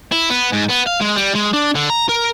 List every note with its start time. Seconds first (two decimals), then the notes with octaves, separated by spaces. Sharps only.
0.12 E4
0.30 B3
0.53 G#2
0.70 B3
0.87 F5
1.01 G#3
1.17 G3
1.35 G#3
1.54 D4
1.75 D3
1.90 A#5
2.09 A#4